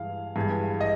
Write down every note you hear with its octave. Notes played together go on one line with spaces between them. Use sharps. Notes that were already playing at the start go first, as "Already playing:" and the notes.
Already playing: G2 E3 G#3 F5
G2 E3 G#3
D#5